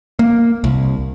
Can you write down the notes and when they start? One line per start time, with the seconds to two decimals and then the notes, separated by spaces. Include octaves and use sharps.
0.19 A#3
0.64 C2